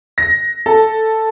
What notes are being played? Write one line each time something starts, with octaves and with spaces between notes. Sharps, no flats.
A#6
A4